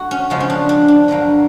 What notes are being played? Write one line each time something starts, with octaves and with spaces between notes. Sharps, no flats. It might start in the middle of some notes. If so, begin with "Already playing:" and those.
Already playing: A3 F#4
C#4
C#3 F3 G#3 B3
C#4
D4
D4
D4
G2 D3 F#3 A#3